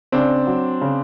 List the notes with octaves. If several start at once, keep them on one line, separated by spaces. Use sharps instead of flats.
C#3 C4 D4
F#3
C#3